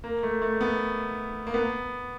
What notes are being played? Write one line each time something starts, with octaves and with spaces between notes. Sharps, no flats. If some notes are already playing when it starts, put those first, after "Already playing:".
A#3
A3
A3
B3
A#3
B3